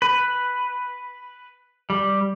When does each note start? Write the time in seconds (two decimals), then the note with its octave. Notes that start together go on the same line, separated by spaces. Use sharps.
0.02 B4
1.90 G3